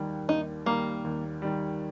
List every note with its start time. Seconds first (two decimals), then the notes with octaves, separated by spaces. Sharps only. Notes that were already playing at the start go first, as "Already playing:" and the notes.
Already playing: D#2 D#3 G3
0.28 D#2 D#4
0.66 D#3 G3 A#3
1.04 D#2
1.42 D#3 G3